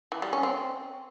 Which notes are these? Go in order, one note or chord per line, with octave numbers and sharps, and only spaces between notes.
E3
G3
C#4
C4